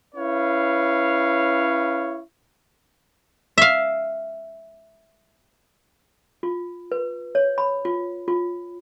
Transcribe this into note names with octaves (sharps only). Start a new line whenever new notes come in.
C#4 E4 B4 C#5 F5
E5 F5
F4
B4
C#5
B5
F4
F4